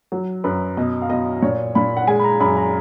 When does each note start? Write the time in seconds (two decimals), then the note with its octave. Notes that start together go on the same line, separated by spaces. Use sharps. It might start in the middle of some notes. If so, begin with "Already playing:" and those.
0.12 F#3
0.44 F#2 B4
0.77 B2 D#5
1.02 F5
1.09 B2 D#5
1.42 A#2 C#5
1.75 A#2 B5
1.97 F#5
2.07 G#3 G#5
2.19 B5
2.24 A#5
2.40 F#2 B5
2.57 A#5